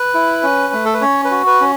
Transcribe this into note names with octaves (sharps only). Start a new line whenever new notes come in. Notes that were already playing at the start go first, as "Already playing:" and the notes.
Already playing: B4
E4
C#4
A3
A4
B4
C#4 C#5
B4
F#4
B4
C#4